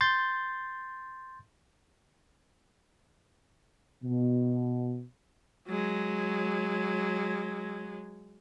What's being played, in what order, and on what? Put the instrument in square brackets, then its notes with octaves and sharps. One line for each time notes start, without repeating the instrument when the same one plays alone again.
[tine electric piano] C6 G6 A6
[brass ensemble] B2
[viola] F#3 G#3